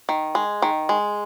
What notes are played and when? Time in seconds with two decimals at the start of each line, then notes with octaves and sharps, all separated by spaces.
0.09 D#3
0.35 G#3
0.62 D#3
0.89 G#3